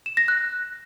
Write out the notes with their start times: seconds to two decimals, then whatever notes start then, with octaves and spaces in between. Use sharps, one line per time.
0.06 E7
0.17 A#6
0.28 F#6